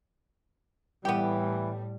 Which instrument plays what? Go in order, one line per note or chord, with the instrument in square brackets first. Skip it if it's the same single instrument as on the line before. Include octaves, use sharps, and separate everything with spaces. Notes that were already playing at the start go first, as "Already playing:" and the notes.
[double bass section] A2 G3 [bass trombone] E3 [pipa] B3 G4